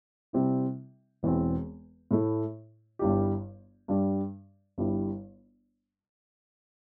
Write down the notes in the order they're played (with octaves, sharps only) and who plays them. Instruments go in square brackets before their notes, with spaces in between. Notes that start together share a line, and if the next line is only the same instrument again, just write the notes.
[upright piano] C3 G3 C4 E4
E1 E2 E3 C4
A2 A3 E4
G1 G2 G3 E4 G4
G2 G3 D4
G1 G2 G3 E4